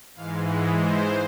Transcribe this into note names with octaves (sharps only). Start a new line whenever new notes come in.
G#2 E3 G#3 F5
F#5
C5